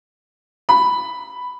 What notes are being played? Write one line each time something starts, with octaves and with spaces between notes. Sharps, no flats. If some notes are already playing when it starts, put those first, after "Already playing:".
B5